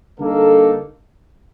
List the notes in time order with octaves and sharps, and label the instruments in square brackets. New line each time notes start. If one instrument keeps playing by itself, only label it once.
[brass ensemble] D3 G3 A#3 D#4 A4